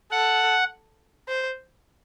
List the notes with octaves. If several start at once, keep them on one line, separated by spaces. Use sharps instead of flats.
A4 F#5
C5